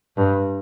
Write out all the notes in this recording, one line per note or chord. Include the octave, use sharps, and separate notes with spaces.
G2